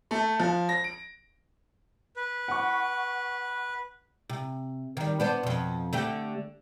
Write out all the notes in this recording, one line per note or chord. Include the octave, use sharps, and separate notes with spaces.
A3
F3
A#6
D7
B4
F#5 C#6
C3
D#3 G3
B3 D4 C5
F2 B2
D3 A3 G4